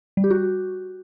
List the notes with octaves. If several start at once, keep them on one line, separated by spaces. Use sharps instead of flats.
G3
G4
F#4